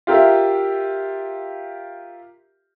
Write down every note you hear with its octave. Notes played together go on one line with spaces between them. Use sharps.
F4 G4 A#4 E5